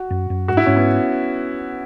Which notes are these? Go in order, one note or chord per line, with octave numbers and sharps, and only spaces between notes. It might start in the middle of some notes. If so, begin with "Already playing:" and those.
Already playing: F#4
F#2
F#2
G#2 F#4
E4
G#2 C#4
B3